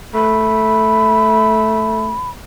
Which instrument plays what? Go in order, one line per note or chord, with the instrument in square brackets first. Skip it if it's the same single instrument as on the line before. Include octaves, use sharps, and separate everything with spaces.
[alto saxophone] A3 [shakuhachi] B5